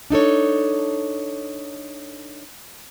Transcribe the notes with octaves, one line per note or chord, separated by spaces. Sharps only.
D4 D#4 A4 C#5